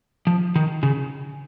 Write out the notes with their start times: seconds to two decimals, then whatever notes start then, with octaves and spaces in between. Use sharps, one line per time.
0.27 F3
0.56 D#3
0.83 C#3